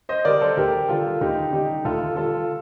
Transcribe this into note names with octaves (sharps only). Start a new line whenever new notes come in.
C5 D#5
D3 G3 A#4 D5
A4 C5
D2 G4 A#4
D3 G3 F4 A4
D2 D#4 G4
D3 G3 D#4 G4
D2 F4 A4
D3 G3 F4 A4